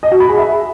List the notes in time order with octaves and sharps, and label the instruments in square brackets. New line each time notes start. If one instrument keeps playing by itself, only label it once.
[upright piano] D#5
F#4
B5
G#4
E5